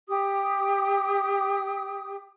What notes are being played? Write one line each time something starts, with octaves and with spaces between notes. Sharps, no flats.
G4 D#6